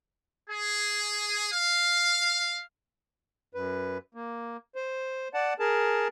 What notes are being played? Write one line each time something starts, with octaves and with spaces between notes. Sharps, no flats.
G#4
F5
F#2 B4
A#3
C5
D5 F#5 A5
G#4 A#4 A5